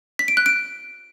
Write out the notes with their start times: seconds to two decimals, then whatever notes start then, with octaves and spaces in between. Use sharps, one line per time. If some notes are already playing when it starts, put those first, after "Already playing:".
0.19 B6
0.28 D7
0.37 F#6
0.46 D7